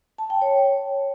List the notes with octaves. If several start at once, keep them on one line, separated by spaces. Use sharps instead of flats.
A5
G5
C#5